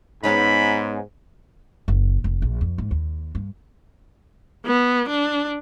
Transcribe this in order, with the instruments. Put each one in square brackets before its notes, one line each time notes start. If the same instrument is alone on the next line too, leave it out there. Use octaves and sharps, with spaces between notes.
[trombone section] G#2 [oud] B3 C#4 D#4 [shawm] B5
[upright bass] F#1
F1
A#1
F2
G#2
D#2
G2
[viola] B3
D4